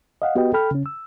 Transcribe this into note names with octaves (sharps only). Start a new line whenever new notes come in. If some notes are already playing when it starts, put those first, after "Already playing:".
D#5 F5 F#5
B3 F#4 G4 B4 D#5 G5
A4 G5 B5 F6
C#3 C#4
E6